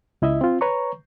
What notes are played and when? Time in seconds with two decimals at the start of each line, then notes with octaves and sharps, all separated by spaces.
0.22 C#2 E4 D#5 E5
0.41 C4 F4
0.61 B4 C#5 A#5 C#6